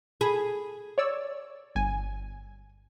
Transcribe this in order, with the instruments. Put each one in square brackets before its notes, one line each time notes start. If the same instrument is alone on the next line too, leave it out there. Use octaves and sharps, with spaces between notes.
[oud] G#4 [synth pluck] B5
[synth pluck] C#5 D5 E6
G1 G#5